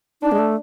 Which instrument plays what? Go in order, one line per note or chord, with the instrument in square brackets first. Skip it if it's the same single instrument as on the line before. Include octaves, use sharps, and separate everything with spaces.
[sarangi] D4 [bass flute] D#4
[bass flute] G#3
A3